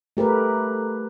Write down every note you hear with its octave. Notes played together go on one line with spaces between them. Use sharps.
A3 G4 A#4 B4